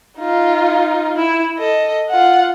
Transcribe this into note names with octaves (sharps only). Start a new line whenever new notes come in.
D#4 F4
E4
A4 D#5
F4 F#5